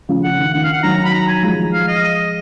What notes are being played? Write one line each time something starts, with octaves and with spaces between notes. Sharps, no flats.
C#3 F3
C#3 F#5
D#3
D#3 F#5
F5
F#5
D#3 F#3 A#5
B5
A#5
G#5
F3 G#3
F5
D#5